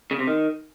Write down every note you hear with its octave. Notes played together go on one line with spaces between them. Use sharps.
C#3
C3
D#3